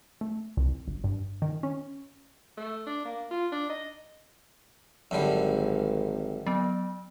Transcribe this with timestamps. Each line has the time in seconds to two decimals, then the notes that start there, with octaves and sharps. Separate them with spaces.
0.21 A3
0.57 C2
0.88 G1
1.04 G2
1.42 D#3
1.63 C#4
2.57 A3
2.87 D4
3.05 A#3
3.31 F4
3.52 D4
3.69 D#5
5.11 G#1 F#2 D3 G3
6.46 F#3 B3